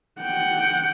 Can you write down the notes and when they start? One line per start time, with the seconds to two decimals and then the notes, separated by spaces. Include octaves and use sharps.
0.21 F#5 G5